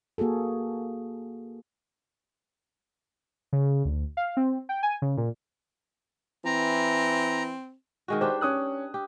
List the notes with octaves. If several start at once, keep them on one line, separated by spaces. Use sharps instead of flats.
A#3 F#4 G#4 A4
C#3
D2
F5
C4
G5
G#5
C#3
A#2
E3 C4 A#5
D#3 G#3 F#4
D4 G4 B4 C5
C#4 D#6 F#6
G4